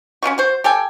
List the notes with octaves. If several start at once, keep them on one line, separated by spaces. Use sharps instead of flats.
C#4 D4 F4 F#4
F#4 C5
G4 A4 G5 G#5